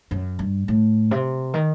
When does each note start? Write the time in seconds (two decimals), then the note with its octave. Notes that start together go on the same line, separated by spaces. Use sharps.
0.11 F#2
0.39 G2
0.68 A2
1.11 C3
1.54 D#3